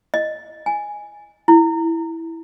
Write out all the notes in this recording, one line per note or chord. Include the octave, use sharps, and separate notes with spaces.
D#5
G#5
E4